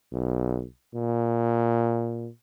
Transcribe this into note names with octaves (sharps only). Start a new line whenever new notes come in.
B1
A#2